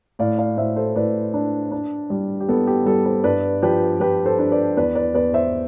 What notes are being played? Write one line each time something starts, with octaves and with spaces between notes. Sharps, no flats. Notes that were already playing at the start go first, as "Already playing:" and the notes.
A2 D5 F5
D5 F5
A2 C5 E5
A4 C5
A2 B4 D5
D4
D4
G3
G4
B3 A4
G4
G3 A4
A4 C5
G2 B4 D5
F3 G4 B4
F3 G4 B4
A4 C5
D4
B4 D5
E2 B4 D5
B4 D5
E2 B4 D5
C5 E5